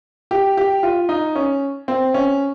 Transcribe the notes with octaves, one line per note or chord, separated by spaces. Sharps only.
G4
G4
F4
D#4
C#4
C4
C#4